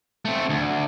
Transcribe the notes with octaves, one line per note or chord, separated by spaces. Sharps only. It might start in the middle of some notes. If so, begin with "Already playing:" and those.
A3 C4
D2